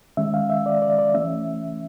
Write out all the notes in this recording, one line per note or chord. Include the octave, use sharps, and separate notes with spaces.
D#3 G#3 C#4 E5
F5
E5
D5
D5
D5
E3 A3 C#4 E5